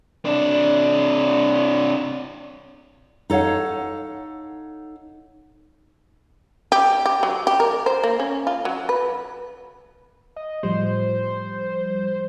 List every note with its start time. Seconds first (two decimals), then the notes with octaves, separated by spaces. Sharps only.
0.25 C3 D4
3.30 D#4 A4 C#5 F5 F#5
6.72 G4
7.06 G4
7.23 F#3
7.47 G4
7.60 A#4
7.86 C5
8.03 A#3
8.20 C#4
8.47 F4
8.65 F#3
8.89 B4
10.36 D#5
10.63 A2 F3 G3 C5